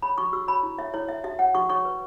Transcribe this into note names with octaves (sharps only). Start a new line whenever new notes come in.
C#5 B5
F#4 C#6
F#4 E6
C#5 B5
E4
C#5 E5
E4 C#5
C#5 E5
F#4 E5
C#5 F#5
F#4 C#6
C#5 C#6
B4